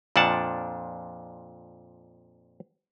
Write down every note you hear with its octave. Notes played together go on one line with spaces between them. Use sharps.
F2 A#2 F3 D4 F#5 A5